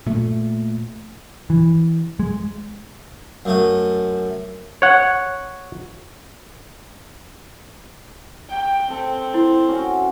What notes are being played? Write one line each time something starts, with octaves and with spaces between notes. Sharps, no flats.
A#2 A3
E3
G#3
F#2 A3 D#6
C#5 F#5
G5
C4 A4
E4 C5
C#4 F#4